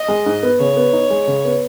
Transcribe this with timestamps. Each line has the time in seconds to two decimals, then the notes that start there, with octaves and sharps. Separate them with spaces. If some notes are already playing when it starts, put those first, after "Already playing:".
Already playing: D#5
0.08 G#3
0.26 G#2
0.43 B3
0.59 C#3 C#5
0.76 B3
0.93 D#4
1.10 G#3
1.27 C#3
1.45 B3